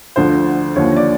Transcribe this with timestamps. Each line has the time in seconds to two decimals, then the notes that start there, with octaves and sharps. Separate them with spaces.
0.16 D2 D3 F3 C5
0.76 D#2 D3 F3 C#5
0.96 D5